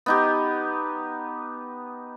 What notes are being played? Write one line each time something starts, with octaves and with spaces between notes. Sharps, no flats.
B3 D#4 G4